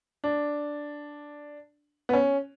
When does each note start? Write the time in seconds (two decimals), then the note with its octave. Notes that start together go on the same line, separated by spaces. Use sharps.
0.24 D4
2.09 B3
2.13 C#4